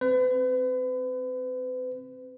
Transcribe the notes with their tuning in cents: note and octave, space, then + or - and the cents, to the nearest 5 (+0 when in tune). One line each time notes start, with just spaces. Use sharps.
C4 +0 B4 +40